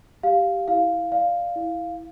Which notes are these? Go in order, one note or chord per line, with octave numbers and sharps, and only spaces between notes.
G4 F5
E4 F5
D5 F5
E4